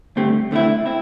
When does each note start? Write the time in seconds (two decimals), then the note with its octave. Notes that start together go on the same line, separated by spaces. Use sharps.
0.16 G2 D3 A3 C4 G4
0.51 D2 D3 A3 C4 E4
0.86 C4 E4